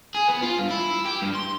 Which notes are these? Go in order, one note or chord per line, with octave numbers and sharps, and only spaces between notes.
G#4
B3
F4
G2
E4
G4
G2
C6